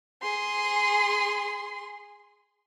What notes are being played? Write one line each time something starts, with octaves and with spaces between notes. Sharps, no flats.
G#4 C6